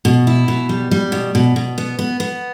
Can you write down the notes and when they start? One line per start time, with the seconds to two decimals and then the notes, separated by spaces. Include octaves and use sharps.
0.05 B2
0.27 E4
0.48 B2
0.69 G3
0.91 G3
1.12 B2
1.35 B2
1.56 B2
1.78 B3
1.99 B3
2.20 B3